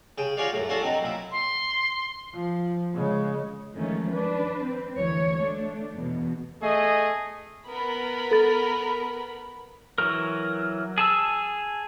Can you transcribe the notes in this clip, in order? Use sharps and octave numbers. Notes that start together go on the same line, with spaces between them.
C#3 G5 D#6
F4 F#4 G#4 C#5 D5 F5
F#2 A2
C#4 D4 F4 F#4 A4 C5
F#3 C4 D#4
A#2 E4
C6
F3
C#3 G#3
D#3 F3 G#3 A3 C#4
D4 B4
C4
D2 E3 C#5
A3 D4
E2 B2
A3 G#4 D#5
B3 A#4 B5
A4 A6
E3 F#3 A#4
G#4 A5 E6